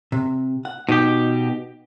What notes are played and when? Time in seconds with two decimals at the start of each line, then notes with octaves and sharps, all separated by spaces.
0.12 C3
0.65 F#5
0.89 B2 D#4 G4